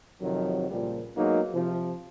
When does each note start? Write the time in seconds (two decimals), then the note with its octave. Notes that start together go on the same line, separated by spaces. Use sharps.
0.21 F2 C3 D#3 F#3
0.69 C#2 A#2 F3 G3
1.16 F#3 G#3 A#3 B3 D#4
1.53 C3 F3